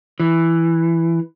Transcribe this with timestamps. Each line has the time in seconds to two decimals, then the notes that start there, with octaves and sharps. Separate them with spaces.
0.20 E3